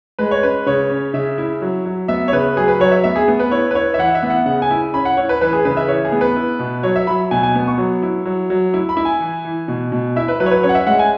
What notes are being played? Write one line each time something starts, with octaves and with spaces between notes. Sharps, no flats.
G#3 B4
C#5
C#4 B4
C#3 C#5
C#4
C#3 E5
E4
F#3
F#3
B3 E5
C#5
C#3 B4
F#3 G#4
B4
F#3 C#5
E5
B3 E5
G#4
B3
B4
E4 C#5
B4
E4 C#5
E5
E3 F#5
E5
B3
F#5
C#3 F#5
G#5
E4
C#4 B5
F#5
E4 C#5
B4
E3 B4
G#4
C#3 B4
E5
E3 C#5
G#4
B3
B4
E4
B2
F#3 C#5
E5
F#3 B5
B2 G#5
G#5
B3
C#6
F#3
E4
F#3
F#3
E4
B5
E4
G#5
E3
E3
B2
B2
E4 E5
B4
F#3 B4
C#5
B4
C#4 C#5
F#5
E5
G#3 F#5
G#5